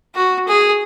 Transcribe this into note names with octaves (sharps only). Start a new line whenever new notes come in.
F#4
G#4